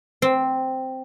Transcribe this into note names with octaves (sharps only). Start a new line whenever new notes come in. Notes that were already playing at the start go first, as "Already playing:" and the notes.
C4